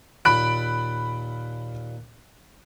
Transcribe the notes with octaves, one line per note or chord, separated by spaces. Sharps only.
D#2 A#2 B5 F#6 D7